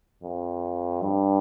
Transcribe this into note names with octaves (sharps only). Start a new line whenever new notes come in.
F2
G2